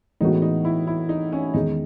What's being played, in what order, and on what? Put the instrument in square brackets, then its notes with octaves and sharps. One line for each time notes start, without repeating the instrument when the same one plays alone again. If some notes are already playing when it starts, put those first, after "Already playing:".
[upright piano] A2 E3 G#3 B3 F#4 [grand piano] D#4
[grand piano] D#4
E4
E4
D#4
C#4
[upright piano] E2 D#3 G#3 [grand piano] D#4